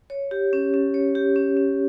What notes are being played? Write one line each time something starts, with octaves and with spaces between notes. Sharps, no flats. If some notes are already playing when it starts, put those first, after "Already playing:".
C#5
G4
C#4
C#4
C#5
G4
C#4
C#4